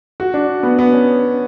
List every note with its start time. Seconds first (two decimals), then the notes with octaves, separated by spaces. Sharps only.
0.20 F#4
0.34 D4
0.63 B3
0.79 B3
0.93 C#4